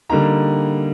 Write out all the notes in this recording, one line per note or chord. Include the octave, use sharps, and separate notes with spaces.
D3 G3 A#3 D#4 A#5